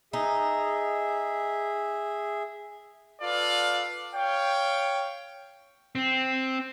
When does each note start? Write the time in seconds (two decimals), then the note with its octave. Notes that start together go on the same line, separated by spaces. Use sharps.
0.13 D#4 G#4 E5
3.21 F4 A4 B4 D5 F5
4.15 C#5 F5 G5
5.95 C4